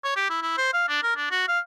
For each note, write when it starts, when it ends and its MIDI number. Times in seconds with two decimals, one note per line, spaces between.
0.04 0.13 73
0.16 0.30 67
0.30 0.39 64
0.42 0.56 64
0.57 0.71 72
0.73 0.84 77
0.88 0.99 62
1.03 1.16 70
1.16 1.28 62
1.31 1.46 66
1.48 1.60 77